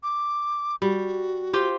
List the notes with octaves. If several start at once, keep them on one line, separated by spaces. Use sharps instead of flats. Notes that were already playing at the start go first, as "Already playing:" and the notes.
D6
G3 F#4
F4 G4 C5